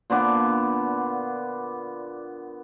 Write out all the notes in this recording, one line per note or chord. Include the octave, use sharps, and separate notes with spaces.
A#2 D3 B3 D6